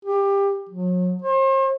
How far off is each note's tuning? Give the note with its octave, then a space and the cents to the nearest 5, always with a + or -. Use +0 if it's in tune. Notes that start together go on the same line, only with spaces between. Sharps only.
G4 +20
F#3 -40
C5 +40